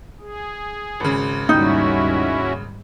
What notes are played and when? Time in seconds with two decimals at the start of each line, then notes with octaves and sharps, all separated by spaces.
0.20 G#4
1.00 G#1 C#3
1.49 D#2 G#2 G3 C#4 D#4 E4 F#4